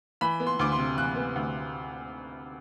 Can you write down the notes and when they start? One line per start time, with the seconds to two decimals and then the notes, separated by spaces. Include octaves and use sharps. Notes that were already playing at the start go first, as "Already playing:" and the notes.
0.21 E3 B5
0.40 B3
0.47 C6
0.59 D2 D6
0.72 C6
0.78 C3
0.97 E3 F#6
1.16 B3
1.36 D2